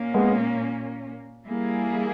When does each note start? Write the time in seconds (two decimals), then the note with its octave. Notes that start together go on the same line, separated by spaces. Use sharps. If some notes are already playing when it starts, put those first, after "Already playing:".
Already playing: A#2 A#3 C#4
0.14 G#3 B3
1.45 G3 A#3 E4 G#4